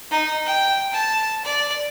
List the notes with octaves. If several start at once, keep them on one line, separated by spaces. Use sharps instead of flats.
D#4
G5
A5
D5